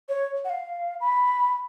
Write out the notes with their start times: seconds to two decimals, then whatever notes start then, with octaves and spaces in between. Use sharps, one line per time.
0.09 C#5
0.45 F#5
0.50 F5
1.01 B5